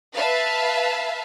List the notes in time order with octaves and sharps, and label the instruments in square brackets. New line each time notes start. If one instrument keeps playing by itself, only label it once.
[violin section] B4 E5 F5 A5